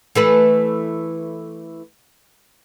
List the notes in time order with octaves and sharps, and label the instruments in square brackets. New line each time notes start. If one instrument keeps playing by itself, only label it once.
[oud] E3 A3 B4